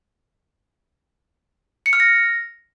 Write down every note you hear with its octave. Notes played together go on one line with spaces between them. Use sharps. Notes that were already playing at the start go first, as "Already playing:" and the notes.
C#7
F6
A#6